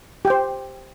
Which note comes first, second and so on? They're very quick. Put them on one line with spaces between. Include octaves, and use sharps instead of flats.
G4 G5 C5